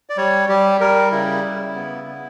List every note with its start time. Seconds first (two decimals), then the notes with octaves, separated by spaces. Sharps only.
0.10 D5
0.17 G3 C#5
0.49 G3 G4
0.80 G3 A#4
1.12 C#3 E4
1.44 C#3
1.75 B3
2.07 B3